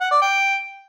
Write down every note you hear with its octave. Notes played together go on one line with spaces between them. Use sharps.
F#5
D5
G5